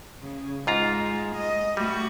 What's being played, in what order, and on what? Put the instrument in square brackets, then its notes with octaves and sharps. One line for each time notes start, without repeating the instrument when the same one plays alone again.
[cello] C#3
[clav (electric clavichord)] G#2 F4 A#5 [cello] G#3
[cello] D#5
[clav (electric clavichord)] G3 [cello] A3 F#4